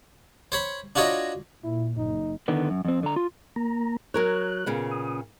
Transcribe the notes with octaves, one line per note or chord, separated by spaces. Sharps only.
C5 C#5 B5
D4 F4 F#4 C#5 D#5 A#5
A#2 E4
F#1 D#4
D3 D#3 B3
F#2
F2 C4
D3 A#5
F4
A#3 A#5
F#3 A#4 C#5 F#6
A#2 C#3 B3
D#6